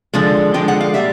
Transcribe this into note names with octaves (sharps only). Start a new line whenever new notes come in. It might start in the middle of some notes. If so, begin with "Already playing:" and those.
D3 F3 G#3
D3 F3 G#3 G5
F#5
F5
A#2 G3 E5